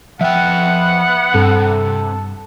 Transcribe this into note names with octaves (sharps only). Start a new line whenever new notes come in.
F3 B3 E5 F#5 G5
G2 C3 A4